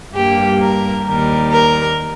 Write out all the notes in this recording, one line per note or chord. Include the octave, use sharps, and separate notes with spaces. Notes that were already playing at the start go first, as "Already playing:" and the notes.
G2 G3 A#3 G4
A#4
D#2 D#3 G3 A#4
A#4